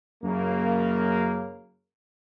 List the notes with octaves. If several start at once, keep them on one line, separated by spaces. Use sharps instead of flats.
F#2 C#3 A#3